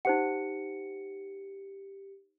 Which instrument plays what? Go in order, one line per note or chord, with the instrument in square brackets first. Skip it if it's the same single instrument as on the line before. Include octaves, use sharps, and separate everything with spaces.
[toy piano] D#4 C5 F#5 [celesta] G4 C#7